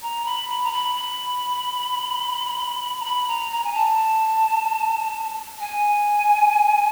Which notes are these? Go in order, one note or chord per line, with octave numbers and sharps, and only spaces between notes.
A#5
B5
B5
A#5
B5
B5
A#5
B5
A#5
A#5
G#5
A5
G#5